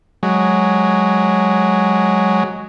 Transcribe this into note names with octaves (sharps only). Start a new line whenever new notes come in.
F#3 G#3